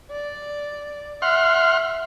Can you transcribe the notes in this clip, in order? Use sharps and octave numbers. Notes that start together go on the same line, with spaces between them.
D5
E5 F#5 C6 F6